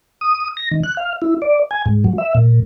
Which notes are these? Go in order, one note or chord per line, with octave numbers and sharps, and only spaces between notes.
D#6
A#6
D#3
F#6
F5
E4
D5
G#5
G#2
F#3
E5
A#2